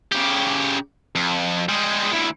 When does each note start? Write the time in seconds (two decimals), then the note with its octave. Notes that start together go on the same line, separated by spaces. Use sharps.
0.12 C#3 G4
1.15 F2
1.69 G3 G#3
2.12 D2 E3